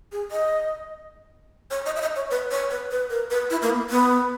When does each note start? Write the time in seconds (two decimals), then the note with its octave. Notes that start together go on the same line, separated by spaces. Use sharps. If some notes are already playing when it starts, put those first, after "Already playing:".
0.12 G#4
0.31 D#5
1.71 C#5
1.86 D#5
1.96 E5
2.01 D#5
2.16 C#5
2.31 B4
2.51 C#5
2.70 B4
2.91 B4
3.10 A#4
3.30 B4
3.50 E4
3.62 A#3
3.70 B3
3.90 B3